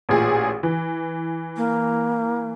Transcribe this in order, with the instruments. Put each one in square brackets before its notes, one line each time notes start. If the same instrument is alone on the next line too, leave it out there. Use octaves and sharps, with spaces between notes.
[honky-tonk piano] A1 A#2 G#4
E3
[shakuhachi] A#3